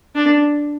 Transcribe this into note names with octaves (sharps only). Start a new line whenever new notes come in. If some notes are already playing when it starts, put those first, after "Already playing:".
D4